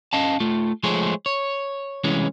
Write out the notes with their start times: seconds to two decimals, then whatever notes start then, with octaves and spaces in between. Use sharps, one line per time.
0.13 C#4 D#5 F5 A5
0.40 A3 F4
0.83 F3 G#3 A3 G#4 C5 C#5
1.26 C#5
2.04 C2 E3 G#3 C#4